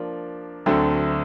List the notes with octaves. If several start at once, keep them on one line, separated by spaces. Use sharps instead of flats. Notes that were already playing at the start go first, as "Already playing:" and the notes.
Already playing: F3 A#3 D4
D2 D3 F#3 A3 C4